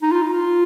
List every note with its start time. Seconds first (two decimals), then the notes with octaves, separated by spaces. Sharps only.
0.02 D#4
0.12 F4
0.23 D#4
0.33 F4